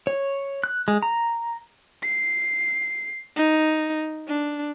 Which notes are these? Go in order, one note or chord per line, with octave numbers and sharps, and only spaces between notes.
C#5
F#6
G#3
A#5
C7
D#4
D4